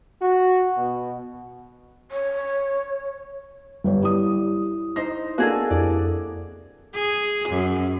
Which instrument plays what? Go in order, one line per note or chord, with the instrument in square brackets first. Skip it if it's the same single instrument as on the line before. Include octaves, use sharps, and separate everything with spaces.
[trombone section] F#4
B2
[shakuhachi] C#5
[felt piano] G1 G4 C#5 [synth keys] G3
[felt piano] G3 D#6 [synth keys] E4
[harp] D#4 C5 [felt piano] A#6
[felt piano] A#3 D4 [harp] F#4 G#4 A4
[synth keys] F2 E4 G4 [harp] D5
[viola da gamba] G#4
F#2